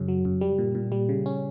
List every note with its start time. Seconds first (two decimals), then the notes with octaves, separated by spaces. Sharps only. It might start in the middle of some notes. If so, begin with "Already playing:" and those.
Already playing: F#2 C#3 C#4
0.08 F#3
0.25 F#2
0.41 G3
0.58 A#2
0.75 A#2
0.92 G3
1.09 C#3
1.26 C#4